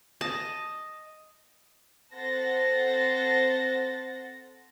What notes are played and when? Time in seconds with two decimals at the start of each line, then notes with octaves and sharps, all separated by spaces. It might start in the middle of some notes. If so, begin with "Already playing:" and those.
0.21 D#5 A5
2.14 C4 A4 C5 F#5 A6 A#6